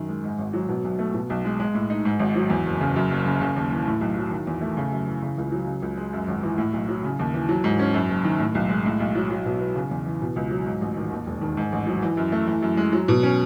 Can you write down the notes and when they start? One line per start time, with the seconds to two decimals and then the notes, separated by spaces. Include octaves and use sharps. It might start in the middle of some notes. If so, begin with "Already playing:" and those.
Already playing: F#2 D#3
0.09 G#3
0.24 G#2
0.39 G#1
0.53 F#3
0.69 B2
0.84 B1
0.99 A3
1.14 B2
1.30 B1
1.45 G#3
1.60 G#3
1.74 A2
1.90 D#4
2.05 G#2
2.20 G#1
2.35 F#3
2.50 E2
2.66 F#1
2.81 C#3
2.96 F#2
3.11 F#1
3.26 C#3
3.41 C#3
3.56 D#2
3.72 E3
3.87 A2
4.01 B1
4.16 F#3
4.31 D#3
4.47 E2
4.61 A3
4.77 C#3
4.92 F#2
5.07 E3
5.22 C#3
5.38 C#2
5.52 F#3
5.67 C#3
5.82 C#2
5.97 G#3
6.13 F#2
6.28 G#1
6.43 E3
6.58 A2
6.73 B1
6.88 F#3
7.04 C#3
7.19 D#2
7.34 E3
7.49 F#3
7.64 G#2
7.79 C#4
7.94 F#2
8.09 F#1
8.24 D#3
8.39 A2
8.55 B1
8.69 G#3
8.85 A2
9.00 B1
9.15 F#3
9.30 F#3
9.45 B2
9.60 B3
9.75 C#3
9.91 E2
10.06 E3
10.21 B2
10.36 C#2
10.50 F#3
10.66 G#2
10.81 A1
10.97 D#3
11.11 D#2
11.26 E1
11.41 D#3
11.57 G#2
11.72 A1
11.87 F#3
12.02 E3
12.17 F#2
12.32 A3
12.47 E3
12.62 F#2
12.77 G#3
12.92 F#3
13.08 B2
13.23 C#4